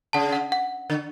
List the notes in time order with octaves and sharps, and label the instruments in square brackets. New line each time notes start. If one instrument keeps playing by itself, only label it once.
[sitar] C#3 [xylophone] F#5 A5
[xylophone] F#5
F#5
[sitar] D3